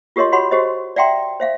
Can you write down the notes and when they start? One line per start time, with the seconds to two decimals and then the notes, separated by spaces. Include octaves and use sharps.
0.16 F4 G4 A#4 C#5 D#5 C6
0.32 F#4 G4 C#5 F#5 B5 C6
0.51 F#4 G4 C5 D#5
0.96 D5 E5 F#5 G5 A#5 C6
1.40 C5 E5 F5